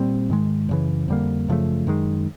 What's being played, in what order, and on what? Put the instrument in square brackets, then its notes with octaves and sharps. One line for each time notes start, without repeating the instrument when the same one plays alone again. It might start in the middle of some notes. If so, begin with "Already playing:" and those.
Already playing: [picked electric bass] A#2 G3 C4
G#2 D#3 G#3
F#2 C#3 E3
F2 D3 G3 A#3
F#2 C#3 F3 A3
F#2 D#3 G#3